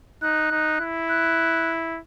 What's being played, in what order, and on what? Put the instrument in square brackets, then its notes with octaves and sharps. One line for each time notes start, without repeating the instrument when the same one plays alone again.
[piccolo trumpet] D#4 [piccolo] F#6
[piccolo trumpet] D#4
E4
[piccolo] F#6